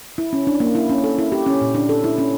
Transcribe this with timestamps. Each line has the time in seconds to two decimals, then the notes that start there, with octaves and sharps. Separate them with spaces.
0.18 E4
0.33 C#4
0.47 D4
0.60 A#3
0.75 E4
0.89 C#4
1.04 A4
1.19 E4
1.32 G4
1.46 C#4
1.61 A#2
1.75 D4
1.89 A4
2.04 E4
2.18 C#4